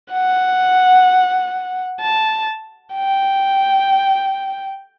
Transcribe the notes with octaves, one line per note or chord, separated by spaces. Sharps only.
F#5
A5
G5